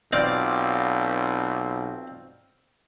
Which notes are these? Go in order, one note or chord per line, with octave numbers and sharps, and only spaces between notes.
B1 C4 F4 D5